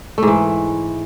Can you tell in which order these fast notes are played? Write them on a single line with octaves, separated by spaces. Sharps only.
A3 G#2 E3